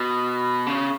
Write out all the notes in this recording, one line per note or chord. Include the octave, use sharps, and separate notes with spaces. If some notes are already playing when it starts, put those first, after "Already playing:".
Already playing: B2
C#3